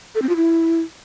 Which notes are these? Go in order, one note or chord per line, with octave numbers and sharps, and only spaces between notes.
A4
C4
F4
E4